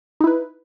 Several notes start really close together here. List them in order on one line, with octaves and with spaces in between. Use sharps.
D#4 E4 B4